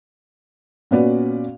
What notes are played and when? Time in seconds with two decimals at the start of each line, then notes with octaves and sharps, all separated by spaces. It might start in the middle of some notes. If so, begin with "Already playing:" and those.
0.91 A#2 B3 C#4 F#4 B4 D5